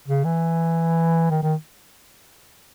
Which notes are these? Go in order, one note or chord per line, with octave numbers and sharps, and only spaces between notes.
C#3
E3
D#3
D#3